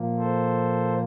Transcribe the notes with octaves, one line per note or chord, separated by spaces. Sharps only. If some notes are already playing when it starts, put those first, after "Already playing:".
Already playing: A#2 F3 A#3
A4 C5